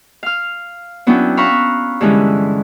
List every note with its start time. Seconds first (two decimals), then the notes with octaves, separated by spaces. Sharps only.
0.23 F5 F6
1.07 F#3 B3 C#4 D4 E4 G5
1.37 F5 A#5 B5 C#6 E6 F#6
2.01 G2 D3 E3 G#3 C#4 E4